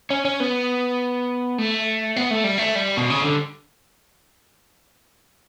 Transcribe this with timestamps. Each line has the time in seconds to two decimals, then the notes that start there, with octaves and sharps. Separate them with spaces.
0.10 C#4
0.25 C#4
0.40 B3
1.58 A3
2.16 B3
2.31 A3
2.44 G3
2.58 A3
2.75 G3
2.97 B2
3.10 C#3
3.22 D3